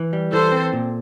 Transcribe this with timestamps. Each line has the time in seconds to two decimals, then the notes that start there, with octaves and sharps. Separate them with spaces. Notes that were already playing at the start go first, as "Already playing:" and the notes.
Already playing: E3
0.13 G3
0.32 E3 A4 C5
0.52 C4
0.73 A#2